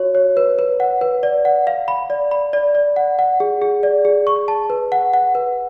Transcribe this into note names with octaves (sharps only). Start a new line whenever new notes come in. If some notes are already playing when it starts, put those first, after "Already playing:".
Already playing: F#4 C#5
C#5
B4
B4
F#5
B4
D5
F#5
F5
B5
D5
B5
D5
D5
F#5
F#5
G#4
G#4
D5
G#4
C#6
A5
B4
F#5
F#5
B4